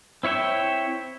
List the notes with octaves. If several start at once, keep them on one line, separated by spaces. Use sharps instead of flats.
C4 E4 C#5 E5 G5